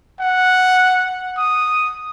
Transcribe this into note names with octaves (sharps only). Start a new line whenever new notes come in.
F#5
D#6